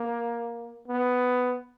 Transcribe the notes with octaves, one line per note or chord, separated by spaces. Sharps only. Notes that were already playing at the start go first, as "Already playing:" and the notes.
Already playing: A#3
B3